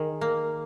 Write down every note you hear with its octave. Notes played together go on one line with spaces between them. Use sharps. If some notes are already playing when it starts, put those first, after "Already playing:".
Already playing: D#3 G#4
A#3